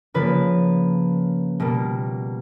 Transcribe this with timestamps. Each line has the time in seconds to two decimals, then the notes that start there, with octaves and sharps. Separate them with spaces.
0.14 C#3 F3 A#3 B4
1.60 B2 G3 A#3